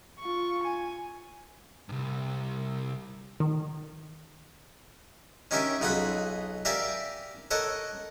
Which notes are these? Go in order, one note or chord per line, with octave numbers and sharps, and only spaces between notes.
F4 C#6
G#5
C2 G2
D#3
C#4 D#4 G4 A#4 E5 G#5
B1 D#4 F4 G#4 F#5 B5
G4 A#4 D5 E5 F5 G#5
A4 A#4 C#5 D#5 F#5